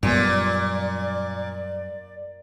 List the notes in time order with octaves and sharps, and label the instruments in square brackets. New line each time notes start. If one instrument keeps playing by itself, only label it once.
[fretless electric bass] F#2 G3 B3 [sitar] A#2 [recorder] D5